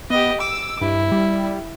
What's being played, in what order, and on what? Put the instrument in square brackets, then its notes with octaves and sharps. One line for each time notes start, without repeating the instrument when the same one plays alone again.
[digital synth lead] B3 [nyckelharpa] G4 D#5
[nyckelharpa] D6 [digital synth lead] E6
[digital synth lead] G2 [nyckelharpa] E4
[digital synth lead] G3